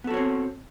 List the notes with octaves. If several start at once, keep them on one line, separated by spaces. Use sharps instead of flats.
B3 C4 F#4 A4 C#5